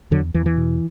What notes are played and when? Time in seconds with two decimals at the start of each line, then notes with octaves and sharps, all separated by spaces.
0.11 E2 D3 F#3
0.34 E2 E3
0.46 E3
0.57 B2